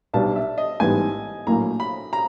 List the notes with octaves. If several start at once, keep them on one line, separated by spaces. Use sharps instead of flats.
B1 B2 G3 B3 D4 A5
E5
D#5
A1 G#2 E3 G3 B3 G#5
A#1 A2 F#3 A#3 A#5
B5
A#5